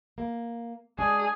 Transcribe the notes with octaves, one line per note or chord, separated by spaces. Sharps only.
A#3
G#3 D4 G#4